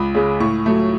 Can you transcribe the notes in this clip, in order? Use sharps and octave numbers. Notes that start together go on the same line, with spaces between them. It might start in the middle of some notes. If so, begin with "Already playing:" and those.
Already playing: C#2 B5
C#3 G#3
A2 C#6
F#3 A3